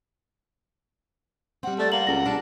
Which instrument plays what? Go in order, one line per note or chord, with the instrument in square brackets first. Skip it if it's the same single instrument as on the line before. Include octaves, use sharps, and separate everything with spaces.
[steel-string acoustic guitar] G3 C4 [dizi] F#5
[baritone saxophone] A3 [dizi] D5
[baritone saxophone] A#3 [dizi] F#5 [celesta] F#7
[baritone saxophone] C#2 [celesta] A#6
[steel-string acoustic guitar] B2 G3 A5 [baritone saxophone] D4